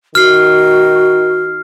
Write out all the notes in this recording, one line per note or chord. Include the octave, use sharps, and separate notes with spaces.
D#3 F#4 F6 C7